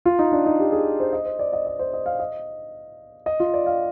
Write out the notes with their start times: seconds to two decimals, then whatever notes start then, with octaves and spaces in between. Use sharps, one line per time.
0.05 F4
0.19 D#4
0.32 D4
0.46 D#4
0.60 G4
0.72 G#4
1.00 C5
1.13 D#5
1.25 C5
1.39 D5
1.53 D#5
1.67 D#5
1.79 C5
1.94 D#5
2.06 F5
2.19 D#5
3.26 D#5
3.40 F4
3.54 D5
3.66 F5